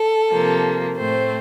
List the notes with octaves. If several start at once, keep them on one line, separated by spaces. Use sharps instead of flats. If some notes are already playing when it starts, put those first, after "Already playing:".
Already playing: A4
C3 F3 A#3
A2 A3 C4 C5